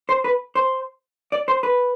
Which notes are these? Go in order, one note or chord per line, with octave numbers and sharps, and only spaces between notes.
C5
B4
C5
D5
C5
B4